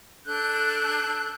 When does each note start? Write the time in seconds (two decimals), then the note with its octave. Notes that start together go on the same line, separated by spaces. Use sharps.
0.25 D4 A4 F#6 G6